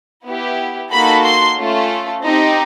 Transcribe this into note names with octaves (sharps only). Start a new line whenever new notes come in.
B3 E4 G4
A#3 D#4 F#4 A4 B5
C6
A3 C#4 F4 A4
C4 D#4 G4